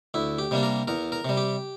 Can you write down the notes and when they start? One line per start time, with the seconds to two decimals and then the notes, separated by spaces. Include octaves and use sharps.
0.14 D2 E4
0.39 G4
0.51 C3 G3 A#3 D4
0.63 A#4
0.88 E2 A#4
1.12 A#4
1.25 C3 G3
1.37 G4